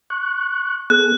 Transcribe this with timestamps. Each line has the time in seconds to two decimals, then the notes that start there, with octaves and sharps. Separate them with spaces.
0.10 C#6 F#6
0.90 B3 G#4 A4 F#6